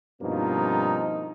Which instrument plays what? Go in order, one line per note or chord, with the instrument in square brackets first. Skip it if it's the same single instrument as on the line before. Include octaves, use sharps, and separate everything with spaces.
[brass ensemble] G2 B2 F3 A#3 C4 D#4